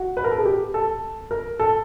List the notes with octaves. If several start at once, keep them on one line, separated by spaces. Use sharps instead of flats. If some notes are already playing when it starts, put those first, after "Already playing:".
Already playing: F#4
B4
A#4
A4
G#4
G4
A4
A#4
A4